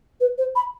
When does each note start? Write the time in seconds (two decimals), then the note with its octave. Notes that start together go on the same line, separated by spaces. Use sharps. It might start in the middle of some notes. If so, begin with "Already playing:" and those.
0.20 B4
0.38 C5
0.55 B5